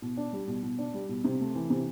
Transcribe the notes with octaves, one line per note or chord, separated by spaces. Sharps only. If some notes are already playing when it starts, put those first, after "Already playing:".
B2
D4
G3
B2
B2
D4
G3
B2
C3
A3
E3
C3